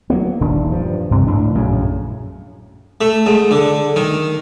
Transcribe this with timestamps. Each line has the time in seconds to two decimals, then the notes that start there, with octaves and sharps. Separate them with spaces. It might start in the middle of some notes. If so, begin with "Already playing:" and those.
0.10 F#3 G3 A#3 B3
0.41 D#1 D#3 D4
0.71 G2 F3
1.11 G2 C3
1.27 C#2 A2 D4
1.54 A#1 F#2 A2 C#3
3.01 A3
3.26 G#2
3.51 D3
3.96 D#3